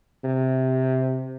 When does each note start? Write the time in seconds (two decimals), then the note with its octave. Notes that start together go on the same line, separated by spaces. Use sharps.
0.24 C3